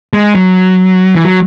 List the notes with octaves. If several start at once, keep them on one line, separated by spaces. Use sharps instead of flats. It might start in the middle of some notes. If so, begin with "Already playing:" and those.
G#3
F#3
E3
F#3